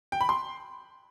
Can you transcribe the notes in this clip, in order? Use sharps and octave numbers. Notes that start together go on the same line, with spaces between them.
G5
B5
C6